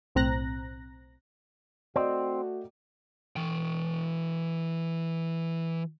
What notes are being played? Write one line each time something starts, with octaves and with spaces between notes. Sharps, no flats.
B1 A2 C4 A#5 F#6 A#6
A3 C4 F#4 D5 D#5 G5
E3 G5